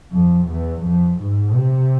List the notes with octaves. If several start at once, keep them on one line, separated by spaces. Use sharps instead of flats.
F2
E2
F2
G#2
C3